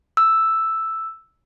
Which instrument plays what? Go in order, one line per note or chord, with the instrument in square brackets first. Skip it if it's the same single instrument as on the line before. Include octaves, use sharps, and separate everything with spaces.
[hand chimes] E6